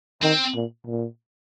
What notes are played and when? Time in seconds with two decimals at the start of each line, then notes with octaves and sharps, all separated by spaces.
0.22 D#3 C4
0.54 A#2
0.86 A#2